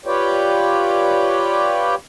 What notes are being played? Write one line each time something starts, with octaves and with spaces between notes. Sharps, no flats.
F4 G4 B4 C#5 D5 G5